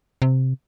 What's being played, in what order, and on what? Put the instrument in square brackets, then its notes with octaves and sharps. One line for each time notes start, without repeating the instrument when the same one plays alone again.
[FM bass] C3